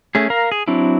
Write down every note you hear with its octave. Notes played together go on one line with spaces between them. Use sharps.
A3 C#4 G#4
A#4 F5 A#5
G#4
F#3 C4 D4 E4